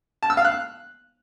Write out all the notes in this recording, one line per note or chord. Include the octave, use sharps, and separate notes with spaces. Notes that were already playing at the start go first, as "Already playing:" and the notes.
A5
E6
F5
F#6